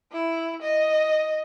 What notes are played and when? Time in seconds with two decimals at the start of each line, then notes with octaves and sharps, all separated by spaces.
0.12 E4
0.62 D#5